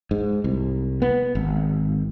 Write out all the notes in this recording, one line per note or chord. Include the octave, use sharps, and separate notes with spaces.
G#2
C2
B3
G#1